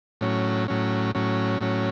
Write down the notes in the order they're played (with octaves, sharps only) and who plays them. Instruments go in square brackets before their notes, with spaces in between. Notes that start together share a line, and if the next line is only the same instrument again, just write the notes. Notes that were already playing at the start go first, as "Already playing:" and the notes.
[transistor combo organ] A2 F#3 C#4
A2 F#3 C#4
A2 F#3 C#4
A2 F#3 C#4